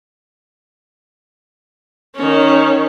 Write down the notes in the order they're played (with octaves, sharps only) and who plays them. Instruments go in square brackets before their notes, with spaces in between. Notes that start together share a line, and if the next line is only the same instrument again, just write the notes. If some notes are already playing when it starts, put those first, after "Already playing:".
[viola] D#3 C#4